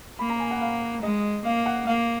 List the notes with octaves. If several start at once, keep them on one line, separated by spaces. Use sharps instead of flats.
A#3 B5
A#5
G#5
F#5
F5
G#3 D#5
A#3 F5
F#5
A#3 F5